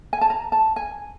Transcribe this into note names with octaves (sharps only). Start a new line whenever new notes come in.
G#5
A5
A#5
A5
G#5